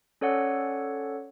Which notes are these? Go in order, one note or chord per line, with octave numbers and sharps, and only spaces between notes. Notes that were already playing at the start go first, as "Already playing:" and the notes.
C#4 A4 C#5 D5 F#5